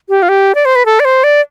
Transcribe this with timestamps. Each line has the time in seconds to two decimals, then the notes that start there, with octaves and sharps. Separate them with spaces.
0.09 G4
0.23 F4
0.29 G4
0.55 D5
0.65 C5
0.76 B4
0.86 A4
1.00 D5
1.05 C5
1.24 D5